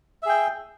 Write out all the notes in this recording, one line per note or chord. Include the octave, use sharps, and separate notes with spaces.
G#4 E5 G5